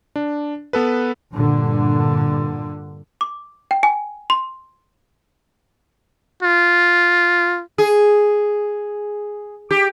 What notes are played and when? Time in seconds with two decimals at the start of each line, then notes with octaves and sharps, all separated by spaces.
0.16 D4
0.73 B3 A4 B4
1.32 G2 A#2 D3
3.21 D6
3.71 G5
3.83 G#5
4.30 C6
6.43 F4
7.78 G#4
9.71 G4